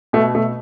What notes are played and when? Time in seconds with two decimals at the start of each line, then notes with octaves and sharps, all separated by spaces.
0.13 B2 A3
0.35 B2 A3